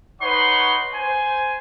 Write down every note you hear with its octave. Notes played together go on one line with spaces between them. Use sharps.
D#4 B4 C#5 F#5 C6
C5 G#5